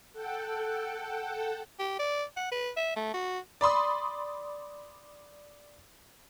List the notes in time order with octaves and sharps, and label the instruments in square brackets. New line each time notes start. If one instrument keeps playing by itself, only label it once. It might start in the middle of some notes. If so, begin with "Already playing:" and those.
[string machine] A4 F#5 G5
[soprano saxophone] G4
D5
F#5
B4
E5
A3
F#4
[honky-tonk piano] D5 B5 C6 D#6